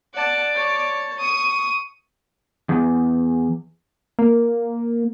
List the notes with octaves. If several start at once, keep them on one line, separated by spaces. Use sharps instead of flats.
D5 F#5 A5
C#5 A5
C#6 D#6 D#7
E2
A#3